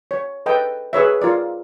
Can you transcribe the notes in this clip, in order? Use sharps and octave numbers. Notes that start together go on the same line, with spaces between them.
C#5
A4 B4 D#5 G5
G#4 B4 C#5 E5
F4 A#4 D5